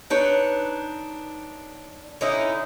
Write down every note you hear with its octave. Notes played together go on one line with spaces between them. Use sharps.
D4 D#4 B4 C#5
D3 C#4 D#4 E4